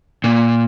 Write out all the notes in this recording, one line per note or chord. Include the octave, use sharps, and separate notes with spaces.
A#2